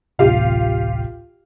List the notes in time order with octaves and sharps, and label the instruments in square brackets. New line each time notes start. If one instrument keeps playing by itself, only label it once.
[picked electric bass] D1 A1 C3 [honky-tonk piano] F4 G4 F5